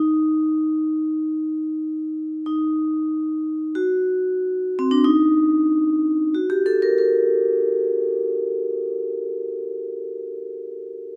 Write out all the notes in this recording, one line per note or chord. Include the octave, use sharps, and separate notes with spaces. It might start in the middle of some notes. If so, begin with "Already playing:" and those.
Already playing: D#4
D#4
F#4
C4
D4
D#4
F#4
G4
A4
A#4
A#4